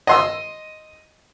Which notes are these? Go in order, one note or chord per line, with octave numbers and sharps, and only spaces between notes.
D#5 C6 E6